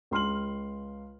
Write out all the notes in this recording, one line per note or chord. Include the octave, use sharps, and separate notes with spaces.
C#2 C6 F6 F#7